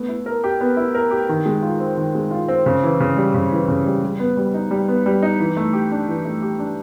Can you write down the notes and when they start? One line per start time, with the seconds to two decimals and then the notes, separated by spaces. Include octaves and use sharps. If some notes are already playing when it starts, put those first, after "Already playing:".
Already playing: A3 B3
0.09 E4
0.26 A#4
0.44 G4
0.61 B3
0.77 E4
0.95 A#4
1.11 G4
1.29 D#3
1.46 G#3
1.62 F4
1.80 C4
1.97 D#3
2.15 G#3
2.31 F4
2.48 C4
2.66 C#3
2.83 E3
3.00 C#3
3.17 G3
3.34 C#3
3.52 E3
3.68 C#3
3.86 G3
4.02 G3
4.19 B3
4.37 G3
4.54 D#4
4.71 G3
4.88 B3
5.06 G3
5.22 D#4
5.40 E3
5.57 A3
5.73 G4
5.91 D4
6.08 E3
6.25 A3
6.42 G4
6.59 D4